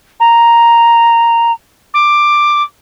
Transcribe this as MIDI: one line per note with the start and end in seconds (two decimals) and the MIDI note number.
0.20 1.52 82
1.94 2.63 86